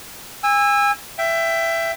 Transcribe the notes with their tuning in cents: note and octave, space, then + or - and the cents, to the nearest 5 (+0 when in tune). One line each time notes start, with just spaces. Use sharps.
G#5 -30 E6 +0
E5 +15 G5 +0